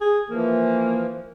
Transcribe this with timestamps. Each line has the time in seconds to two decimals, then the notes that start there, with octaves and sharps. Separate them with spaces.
0.01 G#4
0.30 E3 F3 A#3